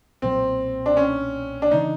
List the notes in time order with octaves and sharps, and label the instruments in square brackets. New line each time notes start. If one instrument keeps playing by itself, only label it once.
[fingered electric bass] B1 A#2 F#3 [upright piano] C4
[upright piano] D4
C#4
D4
[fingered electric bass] C#3 E3 [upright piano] D#4